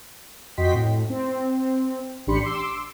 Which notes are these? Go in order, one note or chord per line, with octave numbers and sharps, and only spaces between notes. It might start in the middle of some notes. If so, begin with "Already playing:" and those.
F2 F#4 D#5 G5 C6 B6
A2
C4
A1 D4 G4 B5 C6 C#7
C6 D6 E6